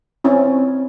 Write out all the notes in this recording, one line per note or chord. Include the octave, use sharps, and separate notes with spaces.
C4 C#4 E4